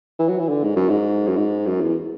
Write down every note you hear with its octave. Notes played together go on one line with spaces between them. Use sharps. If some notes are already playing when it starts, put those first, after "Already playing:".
E3
F#3
E3
D3
G#2
F#2
G#2
F#2
G#2
F#2
E2